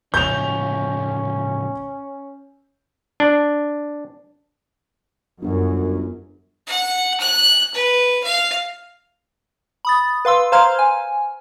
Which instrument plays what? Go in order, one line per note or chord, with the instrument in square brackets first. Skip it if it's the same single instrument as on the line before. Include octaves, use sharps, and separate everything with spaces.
[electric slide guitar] A2 C#3 F3 [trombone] C#4 [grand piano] G6 F7
[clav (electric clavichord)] D4
[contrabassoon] G1 [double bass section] F#2
[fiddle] F#5
F#6
B4
F5
[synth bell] B5 D#6 A6
B4 F5 C6 E6
C5 F5 A#5 C6 F6 G#6
G#5